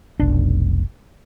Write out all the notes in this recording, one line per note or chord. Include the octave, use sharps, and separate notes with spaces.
F1 B1 D4